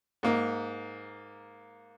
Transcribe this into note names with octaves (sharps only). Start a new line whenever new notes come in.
G#2 A#3